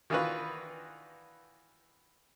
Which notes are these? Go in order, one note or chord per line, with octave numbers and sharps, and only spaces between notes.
D#3 E3 D4 F4 F#4 B4